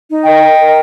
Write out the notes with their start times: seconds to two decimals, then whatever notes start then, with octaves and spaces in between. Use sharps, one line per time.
0.09 D#4
0.26 A#4 D#5 G5
0.42 A#4
0.58 A#4